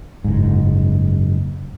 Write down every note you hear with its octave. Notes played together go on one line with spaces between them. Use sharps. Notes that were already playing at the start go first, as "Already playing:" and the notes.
F#1 G#2